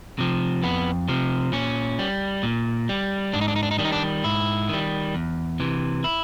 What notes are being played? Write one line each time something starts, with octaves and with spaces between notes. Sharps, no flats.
C3 F3
F2 B3
C3 F3
A#2 C#4
G3
A#2
G3
G#2 D4
D#4
D4
D#4
D4
D#4
D#3 G3 D4
D#4
D4
G#2 E4
D#3 G3
E2
C3 E3
E4